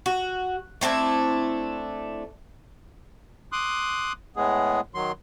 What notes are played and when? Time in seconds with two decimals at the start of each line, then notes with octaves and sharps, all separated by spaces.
0.06 F#4
0.81 A3 C4 D4 E4
3.52 C6 D6 D#6 F#6
4.37 A2 G#3 B3 G#4
4.95 D#3 F#3 C6